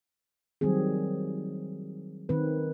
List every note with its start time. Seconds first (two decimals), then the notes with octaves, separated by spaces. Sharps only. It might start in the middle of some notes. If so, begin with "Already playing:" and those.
0.61 D#3 F#3 G3 C4 G#4
2.29 D#3 C4 B4